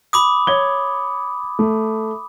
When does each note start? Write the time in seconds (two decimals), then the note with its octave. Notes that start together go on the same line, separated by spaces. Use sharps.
0.13 B5 D6 D#6
0.47 C#5 G#6 G7
1.59 A3